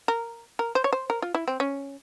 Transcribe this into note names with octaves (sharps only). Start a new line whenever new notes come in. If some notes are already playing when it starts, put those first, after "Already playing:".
A#4
A#4
C5
C#5
C5
A#4
F4
E4
C4
C#4